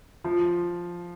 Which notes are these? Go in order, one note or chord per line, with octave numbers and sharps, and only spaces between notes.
F3